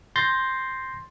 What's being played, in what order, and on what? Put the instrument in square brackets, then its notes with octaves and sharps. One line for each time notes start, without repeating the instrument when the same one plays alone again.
[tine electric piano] C6 G6 A6 A#6 C7